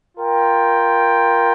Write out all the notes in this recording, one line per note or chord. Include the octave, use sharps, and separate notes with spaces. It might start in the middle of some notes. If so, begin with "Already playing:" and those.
F4 A#4 G5